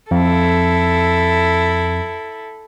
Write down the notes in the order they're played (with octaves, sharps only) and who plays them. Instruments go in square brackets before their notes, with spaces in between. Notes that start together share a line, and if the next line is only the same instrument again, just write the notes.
[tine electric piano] F2 [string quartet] E4 A4